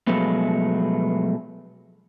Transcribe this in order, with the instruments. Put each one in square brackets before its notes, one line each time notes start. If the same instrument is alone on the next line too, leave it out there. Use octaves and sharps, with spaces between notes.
[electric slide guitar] B2 F3 F#3 G#3 A3 B3